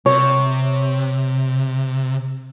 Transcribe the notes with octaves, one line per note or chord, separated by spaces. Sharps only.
C3 C#5